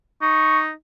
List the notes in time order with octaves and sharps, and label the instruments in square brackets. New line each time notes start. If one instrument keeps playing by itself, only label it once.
[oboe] D#4 [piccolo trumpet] C#6